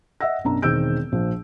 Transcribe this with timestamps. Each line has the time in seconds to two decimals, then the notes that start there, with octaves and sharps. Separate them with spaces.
0.21 D#5 E5 F#5 E6 A#6
0.44 B1 F#2 D4 A#5
0.62 E1 D#3 C4 E6 G6 D7
1.12 A#1 F3